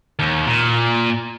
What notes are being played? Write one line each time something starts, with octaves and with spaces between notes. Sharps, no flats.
D#2
A#2